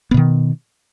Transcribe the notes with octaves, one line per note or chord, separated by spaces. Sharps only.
B2 D#3 B3